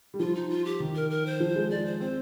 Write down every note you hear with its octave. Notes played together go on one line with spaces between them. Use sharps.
G3
F3 F4
D#4
F4
G4
D#3
A#4
A#4
C5
F3
G#3
G#3 D5
C5
C4 C5